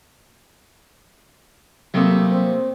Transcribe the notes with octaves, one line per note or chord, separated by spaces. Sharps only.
C3 F#3 G3 A3 A#3 A4 D#6
C4